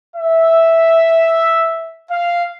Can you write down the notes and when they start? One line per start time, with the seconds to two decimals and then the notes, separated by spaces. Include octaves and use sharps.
0.17 E5
2.11 F5